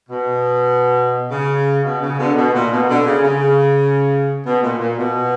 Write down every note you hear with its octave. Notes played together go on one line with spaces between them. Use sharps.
B2
C#3
B2
C#3
B2 D3
B2
A#2
B2
B2 D3
C#3
C#3
B2
A#2
A#2
B2